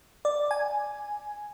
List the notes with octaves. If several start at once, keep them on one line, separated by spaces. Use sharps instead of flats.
D5
G#5